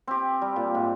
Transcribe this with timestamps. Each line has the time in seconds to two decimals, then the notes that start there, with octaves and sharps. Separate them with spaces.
0.07 C4 G4
0.41 G3
0.56 A#2
0.75 G#2